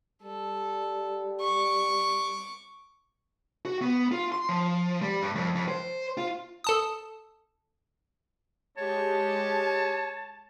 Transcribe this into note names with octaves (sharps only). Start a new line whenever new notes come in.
G3 A4
C#6 D6
F#4
B3
F4
C6
F3
G3
G2
F2
F2
C5
F4
A4 A5 D#6
G#3 G4 C#5 A5